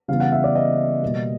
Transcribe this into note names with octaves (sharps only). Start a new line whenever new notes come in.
C#3 E3 G3 B3 F5
F#5
E5
D5
D#5
B2 G3 A#3